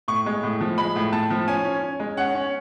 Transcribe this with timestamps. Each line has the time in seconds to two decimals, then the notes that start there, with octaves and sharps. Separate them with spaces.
0.08 A2 C#6
0.26 G#3
0.43 A2
0.61 F3
0.78 G#3 B5
0.96 A2
1.12 A2 A5
1.30 F3
1.47 C#4 G#5
1.64 C#4
1.82 C#4
2.00 G#3
2.17 C#4 F#5
2.35 C#4